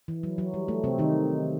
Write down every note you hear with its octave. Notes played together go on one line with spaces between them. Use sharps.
E3
F#3
F#3
G3
A3
C3 C4
D#3 D#4